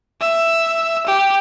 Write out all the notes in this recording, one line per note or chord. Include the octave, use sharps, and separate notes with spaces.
E5
G4